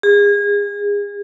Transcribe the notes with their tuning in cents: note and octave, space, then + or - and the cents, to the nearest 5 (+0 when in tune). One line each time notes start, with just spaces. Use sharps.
G#4 -30